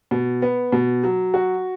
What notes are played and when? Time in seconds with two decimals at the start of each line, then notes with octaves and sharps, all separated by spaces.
0.11 B2
0.42 B3
0.72 B2
1.04 F#3
1.34 F#4